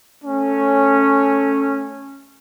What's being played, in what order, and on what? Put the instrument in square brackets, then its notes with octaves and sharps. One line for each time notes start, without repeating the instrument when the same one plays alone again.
[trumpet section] A3 C#4